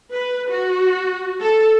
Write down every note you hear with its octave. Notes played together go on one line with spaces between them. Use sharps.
B4
F#4
A4